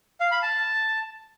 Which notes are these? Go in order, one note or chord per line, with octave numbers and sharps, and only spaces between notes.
F5
B5
A5